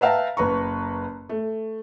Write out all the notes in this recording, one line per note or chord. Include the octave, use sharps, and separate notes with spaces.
B4 E5 F5 G5 A5 A#5
F#1 B4 A#5 C#6
A3